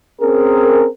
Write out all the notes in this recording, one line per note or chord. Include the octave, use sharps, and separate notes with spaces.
C4 C#4 G#4 A#4